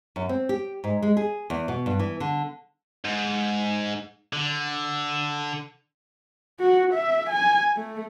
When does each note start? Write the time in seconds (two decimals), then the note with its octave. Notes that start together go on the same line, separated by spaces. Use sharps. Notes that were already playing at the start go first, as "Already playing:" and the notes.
0.16 F#2
0.29 C4
0.49 G4
0.84 G#2
1.02 G#3
1.17 G#4
1.50 E2
1.68 B2
1.86 G2
1.99 E3
2.20 D3
3.05 G#2
4.33 D3
6.60 F#4
6.94 E5
7.30 G#5
7.77 A3